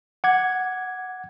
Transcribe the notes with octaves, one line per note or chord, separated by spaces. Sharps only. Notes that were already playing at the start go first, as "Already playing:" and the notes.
F#5 D6 G#6